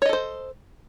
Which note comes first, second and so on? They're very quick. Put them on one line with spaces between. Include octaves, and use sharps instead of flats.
C#5 D#5 A4 C5